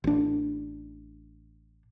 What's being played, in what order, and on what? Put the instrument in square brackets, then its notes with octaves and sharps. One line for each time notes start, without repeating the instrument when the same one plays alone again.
[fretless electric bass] A1 D4